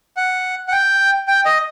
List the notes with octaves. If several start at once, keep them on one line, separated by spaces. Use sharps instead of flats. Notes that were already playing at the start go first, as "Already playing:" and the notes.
F#5
F#5
G5
G5
D#5